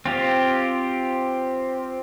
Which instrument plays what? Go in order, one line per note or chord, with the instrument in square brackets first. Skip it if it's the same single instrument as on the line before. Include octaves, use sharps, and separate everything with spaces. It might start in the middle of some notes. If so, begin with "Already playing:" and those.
[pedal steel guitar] C4 F4 G4